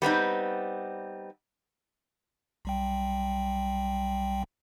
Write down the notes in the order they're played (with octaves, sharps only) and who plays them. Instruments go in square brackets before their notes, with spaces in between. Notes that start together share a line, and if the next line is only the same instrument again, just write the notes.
[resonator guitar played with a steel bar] G3 B3 C4 D#4
[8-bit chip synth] B1 G3 G5